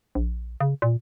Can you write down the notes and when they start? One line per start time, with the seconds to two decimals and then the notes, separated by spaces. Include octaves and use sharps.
0.15 A#1
0.60 C#3
0.82 A#2